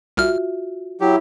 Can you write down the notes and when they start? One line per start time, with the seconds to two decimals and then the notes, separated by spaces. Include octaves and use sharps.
0.17 C2 F4 F#4 E5 F6
1.01 F#3 E4 G4 C#5